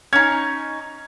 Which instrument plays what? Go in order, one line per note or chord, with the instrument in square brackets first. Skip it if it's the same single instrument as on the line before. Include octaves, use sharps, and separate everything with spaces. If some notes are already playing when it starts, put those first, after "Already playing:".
[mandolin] C#4 D#4 [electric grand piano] G#6